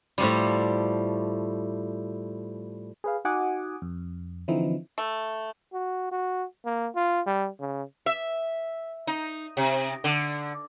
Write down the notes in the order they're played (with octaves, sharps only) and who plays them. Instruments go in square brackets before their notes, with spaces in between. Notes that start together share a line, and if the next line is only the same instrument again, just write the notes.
[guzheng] A2 F3 G3
[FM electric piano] G#4 B4 F5
D#4 F#4 F#5 G#5 D6 D#6
F2
D3 E3 F3 C4 D#4 E4
[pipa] A3
[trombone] F#4
F#4
A#3
F4
G3
C#3
[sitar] E5
D#4
C3
D3